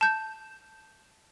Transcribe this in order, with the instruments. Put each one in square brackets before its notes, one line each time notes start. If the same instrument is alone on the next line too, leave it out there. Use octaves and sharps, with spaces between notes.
[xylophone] A5 G6